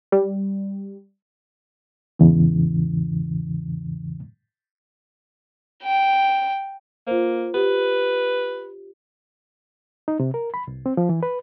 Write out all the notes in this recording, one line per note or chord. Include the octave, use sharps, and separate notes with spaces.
G3
E2 G#2 C#3 E3
G5
A#3 F4 C5
G4 B4
D#4
C3
A#4
B5
C2
C4
F3
E3
B4